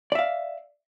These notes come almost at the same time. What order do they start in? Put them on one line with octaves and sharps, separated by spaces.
D5 E5 F5